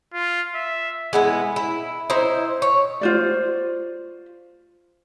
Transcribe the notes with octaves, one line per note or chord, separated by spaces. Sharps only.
F4
E5
G#3 B3 E4
E4
D#4 E4 C5
C#5
F4 C5 D5